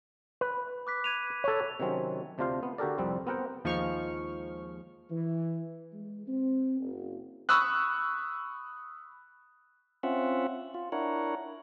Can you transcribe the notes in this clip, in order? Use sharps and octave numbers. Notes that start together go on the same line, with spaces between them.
B4 B5
D6 F#6 B6
G#6 D#7 F7
A4 C#5
C3 D#3 F#3 C4 C#4
D2 C3 D4 F4 C5 F5
B3
D3 F#4 G4 A4 A#4 D5
C2 F2 G3 C4
B3 C4 A#4 F#5 G5
D#2 F3 G#3 C#6 F6
E3
G#3
C4
F#1
B5 C#6 D#6 E6 F#6
C4 C#4 F4 E5 F#5
F4
D4 E4 A#4 C#5 F#5